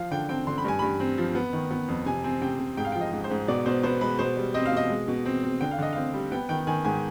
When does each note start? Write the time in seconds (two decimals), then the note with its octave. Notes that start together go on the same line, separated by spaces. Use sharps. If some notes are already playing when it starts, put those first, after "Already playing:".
Already playing: F3 F5
0.11 D3 G5
0.29 C4 G5
0.47 D3 C6
0.58 B5
0.65 G2 G#5
0.79 G2 B5
1.00 C4
1.18 F3
1.35 B3
1.53 D#3
1.71 B3
1.88 F2
2.06 C3 G#5
2.24 C4 G#5
2.41 C3 G5
2.59 C3
2.77 G#2 G5
2.85 F5
2.92 F3 G5
3.01 D#5
3.13 G#2
3.24 C5
3.31 G#2
3.48 B2 D5
3.66 B2 C5
3.83 B3 C5
4.01 G#3 B4
4.19 B2 C5
4.37 G3
4.54 C4 D#5
4.66 F5
4.72 B2 D#5
4.90 G#3
5.08 B2
5.26 C4
5.43 C4
5.61 D3 G5
5.71 F5
5.78 D3 D#5
5.93 C4 F5
6.14 G3
6.32 B3 G5
6.49 D#3 G5
6.67 D#3 G#5
6.85 G#2 G#5